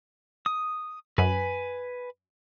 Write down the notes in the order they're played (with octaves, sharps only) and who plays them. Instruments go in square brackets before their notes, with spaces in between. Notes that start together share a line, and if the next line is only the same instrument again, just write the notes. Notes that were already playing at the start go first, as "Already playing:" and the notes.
[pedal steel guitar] D#6
[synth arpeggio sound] F#2 [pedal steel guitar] B4 G#5 B5